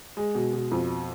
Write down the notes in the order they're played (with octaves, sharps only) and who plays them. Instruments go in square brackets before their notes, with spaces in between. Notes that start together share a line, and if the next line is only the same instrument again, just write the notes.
[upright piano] G#3
B2
B2
F2